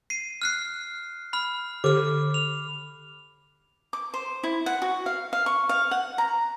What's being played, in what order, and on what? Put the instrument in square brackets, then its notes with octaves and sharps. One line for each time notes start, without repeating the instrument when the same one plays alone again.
[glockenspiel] C7 D#7
F6 F#6 C7
B5 F6
[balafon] D3 G4 A4 [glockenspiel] D6 F6
[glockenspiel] F7
[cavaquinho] D6
C5
E4
F#5
F#4
F5
F5
C#6
F5
F#5
A#5